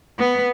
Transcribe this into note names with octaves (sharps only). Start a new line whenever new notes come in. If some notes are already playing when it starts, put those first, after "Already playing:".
B3